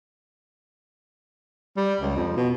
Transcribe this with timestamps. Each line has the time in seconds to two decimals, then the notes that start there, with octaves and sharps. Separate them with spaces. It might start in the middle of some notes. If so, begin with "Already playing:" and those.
1.77 G3
2.01 C#2
2.16 F2
2.36 B2